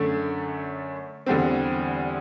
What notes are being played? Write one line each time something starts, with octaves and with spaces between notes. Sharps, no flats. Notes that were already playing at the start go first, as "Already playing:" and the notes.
Already playing: F#2 D3 A3
E2 D3 G3 C4